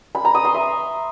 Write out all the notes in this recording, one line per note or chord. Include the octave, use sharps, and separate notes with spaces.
B5
A#5
D#6
C6
E5